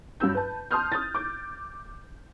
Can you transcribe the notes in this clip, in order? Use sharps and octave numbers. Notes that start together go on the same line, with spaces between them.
G2 F#3 E6 G6
B4 A5
A5 C6 D#6 F6 G6
D#6 G6 A6
D6 G6